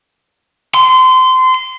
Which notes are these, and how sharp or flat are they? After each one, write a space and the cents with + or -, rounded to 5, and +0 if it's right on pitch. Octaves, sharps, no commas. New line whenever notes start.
C6 -25